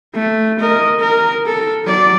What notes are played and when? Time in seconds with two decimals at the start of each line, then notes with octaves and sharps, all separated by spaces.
0.15 A3
0.60 A#4 D#5
0.99 A#4
1.46 A4
1.85 F#3 D5